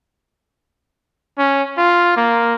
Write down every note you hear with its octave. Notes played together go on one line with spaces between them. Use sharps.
C#4
F4
A#3